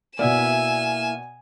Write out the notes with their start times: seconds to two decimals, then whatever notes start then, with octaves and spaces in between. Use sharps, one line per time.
0.19 B2 A#3 B3 E4 D5 E5 G#5 E7